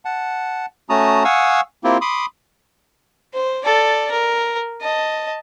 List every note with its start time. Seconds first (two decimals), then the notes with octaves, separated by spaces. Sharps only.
0.05 F#5 A5
0.89 A3 C#4 F#4 A5 A#5 D#6
1.25 F5 F#5 G#5 C#6 D#6 E6
1.84 A#3 C4 E4 F4 G4
2.01 B5 C6 D6 D#6
3.34 C5
3.65 A4 D5
4.12 A#4
4.82 D#5 A5